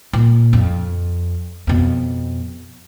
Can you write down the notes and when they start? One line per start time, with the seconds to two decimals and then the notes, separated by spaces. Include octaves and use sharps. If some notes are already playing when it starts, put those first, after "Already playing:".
0.13 A#2
0.53 F2
1.67 F2 B2